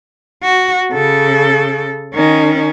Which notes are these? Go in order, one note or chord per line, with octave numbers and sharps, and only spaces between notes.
F#4
C#3 A4
D#3 C#4